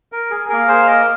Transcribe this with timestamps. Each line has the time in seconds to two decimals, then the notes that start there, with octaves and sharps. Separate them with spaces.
0.12 A#4
0.31 G#4
0.49 A#3 G#4 A#4
0.68 G#4 C5
0.82 F5
0.87 A#4 D#5